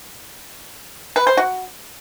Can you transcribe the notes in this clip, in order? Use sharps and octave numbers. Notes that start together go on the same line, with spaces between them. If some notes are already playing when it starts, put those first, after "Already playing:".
B4
C5
F#4